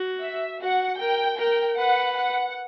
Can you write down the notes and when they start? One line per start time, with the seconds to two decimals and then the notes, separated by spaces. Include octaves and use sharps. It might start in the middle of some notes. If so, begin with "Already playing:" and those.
Already playing: F#4
0.21 E5
0.61 F#4 F#5
0.99 A#4 G5
1.38 A#4 G5
1.77 B4 F#5
2.17 F#5